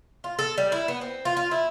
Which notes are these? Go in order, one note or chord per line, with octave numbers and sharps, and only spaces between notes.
F4
A4
G3
E4
B3
C4
F4
F4
E4